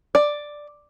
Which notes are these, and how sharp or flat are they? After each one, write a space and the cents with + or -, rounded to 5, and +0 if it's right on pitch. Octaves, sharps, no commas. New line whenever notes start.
D5 +5